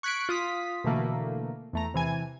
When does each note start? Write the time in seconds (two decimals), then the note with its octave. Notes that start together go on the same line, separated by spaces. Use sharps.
0.03 C#6 F#6 G#6 B6 C#7 D7
0.29 F4 D#6 B6
0.84 B2 D3 E3 A3 A#3
1.73 E2 A3 A#5
1.94 C3 E3 G#5